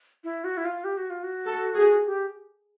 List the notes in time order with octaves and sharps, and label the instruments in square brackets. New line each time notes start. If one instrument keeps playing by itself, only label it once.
[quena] E4
F#4
E4
F4
G4
F#4
F4
F#4
[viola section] A4
G#4
[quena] G4